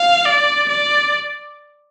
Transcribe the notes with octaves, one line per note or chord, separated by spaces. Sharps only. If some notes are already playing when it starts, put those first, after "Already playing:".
Already playing: F5
D5
D5